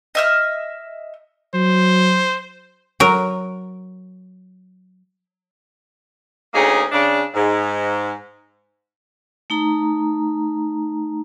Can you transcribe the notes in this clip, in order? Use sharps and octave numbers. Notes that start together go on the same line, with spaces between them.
D#5 E5 F6
F#3 C5
F#3 A#4
D2 A#3 C#4 D#4 G#4
C#3 D4
G#2
A3 D#4 A#5